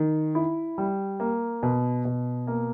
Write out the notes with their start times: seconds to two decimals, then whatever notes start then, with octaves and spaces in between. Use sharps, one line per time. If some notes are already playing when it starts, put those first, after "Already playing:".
Already playing: D#3
0.35 E4
0.78 G3
1.20 A#3
1.63 B2
2.05 B2
2.47 A#3